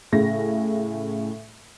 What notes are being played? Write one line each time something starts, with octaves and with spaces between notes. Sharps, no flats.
A2 C#3 A#6